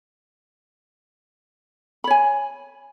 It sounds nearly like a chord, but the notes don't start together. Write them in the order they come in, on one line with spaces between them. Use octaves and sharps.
B5 C#5 G#5